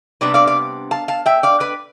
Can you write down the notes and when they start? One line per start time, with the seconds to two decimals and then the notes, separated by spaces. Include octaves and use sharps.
0.21 C3 G3 B3 D4 B4 D5
0.34 D5 F5
0.47 D5 F5
0.91 F5 A5
1.08 F5 A5
1.26 E5 G5
1.43 D5 F5
1.60 B4 D5